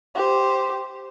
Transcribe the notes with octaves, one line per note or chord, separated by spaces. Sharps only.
G4 C5